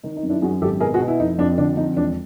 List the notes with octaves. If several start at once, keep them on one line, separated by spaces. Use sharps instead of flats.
D#3 D#4
D#4
F#2
D4 E4
F#2 F#4 G#4
G#1 G4 A4
B2 G#4 A#4
F#4 G#4
B2
E4
F1 D#4
F2 D4
D3 D4
F2 D#4
E1 D4